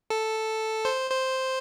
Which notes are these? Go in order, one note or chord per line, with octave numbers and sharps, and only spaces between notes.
A4
C5
C5